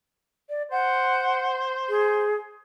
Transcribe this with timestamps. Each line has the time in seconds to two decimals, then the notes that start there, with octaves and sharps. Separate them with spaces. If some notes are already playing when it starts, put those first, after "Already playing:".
0.49 D5
0.71 C5 F#5
1.89 G#4